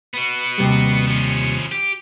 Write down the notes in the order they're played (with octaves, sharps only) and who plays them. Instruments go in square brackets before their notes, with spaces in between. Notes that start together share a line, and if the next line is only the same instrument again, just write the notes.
[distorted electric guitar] B3 F#4
[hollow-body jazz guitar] D#2 C3 G3
[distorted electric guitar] F3 C#4
G4